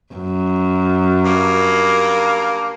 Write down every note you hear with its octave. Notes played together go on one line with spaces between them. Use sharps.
F#2
G2 A#3